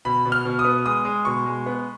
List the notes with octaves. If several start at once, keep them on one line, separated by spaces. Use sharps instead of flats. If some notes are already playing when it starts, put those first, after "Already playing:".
B2 B5
B2
F6
B2
D#6
B3
G#3 D#6
G#3
B2 C#6
G#3
B3